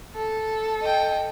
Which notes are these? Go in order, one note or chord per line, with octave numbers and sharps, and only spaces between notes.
A4
D#5 G5